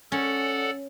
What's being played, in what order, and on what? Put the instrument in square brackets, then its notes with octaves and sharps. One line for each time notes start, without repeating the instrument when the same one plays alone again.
[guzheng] C#4 [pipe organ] A4 D5 F#5